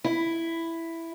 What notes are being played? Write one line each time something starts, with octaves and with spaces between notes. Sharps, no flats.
E4